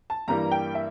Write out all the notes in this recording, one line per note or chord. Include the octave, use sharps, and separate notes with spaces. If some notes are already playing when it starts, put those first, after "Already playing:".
A5
G2 E3 G3 A#3 A#5
G5
E5